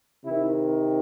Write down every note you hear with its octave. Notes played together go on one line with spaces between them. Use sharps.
C3 D#3 E4